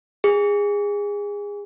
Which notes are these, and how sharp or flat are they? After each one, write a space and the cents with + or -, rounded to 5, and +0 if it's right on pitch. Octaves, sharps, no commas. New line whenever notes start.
G#4 -25